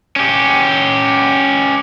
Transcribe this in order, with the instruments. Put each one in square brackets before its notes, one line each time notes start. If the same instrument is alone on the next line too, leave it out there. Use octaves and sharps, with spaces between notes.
[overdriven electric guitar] C#4 G4